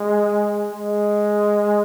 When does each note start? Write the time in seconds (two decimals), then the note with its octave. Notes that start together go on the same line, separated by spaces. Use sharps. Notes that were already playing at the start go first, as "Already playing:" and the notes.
Already playing: G#3
0.73 G#3